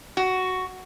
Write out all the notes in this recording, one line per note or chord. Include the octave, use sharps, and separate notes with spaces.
F#4